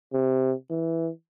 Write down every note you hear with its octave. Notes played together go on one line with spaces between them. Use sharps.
C3
E3